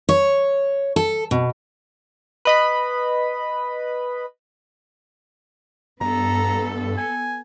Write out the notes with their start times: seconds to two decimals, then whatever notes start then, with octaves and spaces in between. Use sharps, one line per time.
0.09 C#5
0.96 A4
1.31 B2
2.45 B4 D#5 B5
6.01 G2 B3 A4 A#5
6.97 G#5